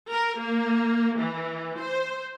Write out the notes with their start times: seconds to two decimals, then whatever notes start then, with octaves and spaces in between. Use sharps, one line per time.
0.11 A#4
0.41 A#3
1.20 E3
1.80 C5